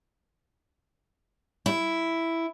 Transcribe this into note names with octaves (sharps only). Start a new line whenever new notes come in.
E4